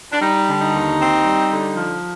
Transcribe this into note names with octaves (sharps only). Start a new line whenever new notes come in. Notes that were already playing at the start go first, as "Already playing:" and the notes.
D4
G3 D#4
D3
D#4
D#2
C4
G3
D3
F3